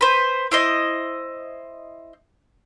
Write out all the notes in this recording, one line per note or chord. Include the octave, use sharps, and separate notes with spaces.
B4 C5
E4 C5 D#5